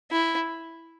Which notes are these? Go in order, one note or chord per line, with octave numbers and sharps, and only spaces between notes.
E4